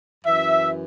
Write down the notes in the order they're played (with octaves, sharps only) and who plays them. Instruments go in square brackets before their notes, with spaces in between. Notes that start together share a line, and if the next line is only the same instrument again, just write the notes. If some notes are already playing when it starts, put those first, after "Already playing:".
[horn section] F#2 E3 E5